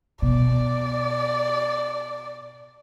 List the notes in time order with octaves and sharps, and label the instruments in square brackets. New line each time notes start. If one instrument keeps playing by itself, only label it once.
[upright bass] B2 [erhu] D5